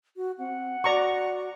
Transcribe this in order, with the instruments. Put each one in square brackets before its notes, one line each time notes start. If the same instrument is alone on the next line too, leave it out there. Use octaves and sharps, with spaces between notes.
[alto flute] F#4
[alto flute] C4 [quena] F#5
[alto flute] F#4 [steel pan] D5 A#5 C#6